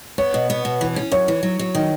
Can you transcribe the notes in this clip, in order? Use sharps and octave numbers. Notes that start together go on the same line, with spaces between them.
B3 C#5
B2
B3
B2
E3
C#4
F#2 C#5
E3
F#3
F#3
D#3